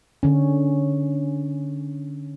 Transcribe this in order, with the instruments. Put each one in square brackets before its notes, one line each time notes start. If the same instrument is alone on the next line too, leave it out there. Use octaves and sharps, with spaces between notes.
[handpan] D3 C#4